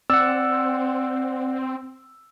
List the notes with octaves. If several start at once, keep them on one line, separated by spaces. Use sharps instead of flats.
C4 D5 F#5 E6